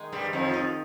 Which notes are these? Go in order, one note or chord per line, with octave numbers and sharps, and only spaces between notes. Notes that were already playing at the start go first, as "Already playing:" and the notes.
Already playing: D#3 G#3 D#4
G2 G3 C4
F2 D#3 F3
D#4